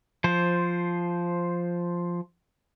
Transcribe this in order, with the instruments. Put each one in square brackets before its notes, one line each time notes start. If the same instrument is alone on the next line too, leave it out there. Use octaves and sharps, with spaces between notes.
[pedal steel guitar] F3 C5